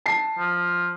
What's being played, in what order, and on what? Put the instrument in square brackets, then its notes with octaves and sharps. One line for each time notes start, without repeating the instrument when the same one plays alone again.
[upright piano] A5 C7
[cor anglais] F3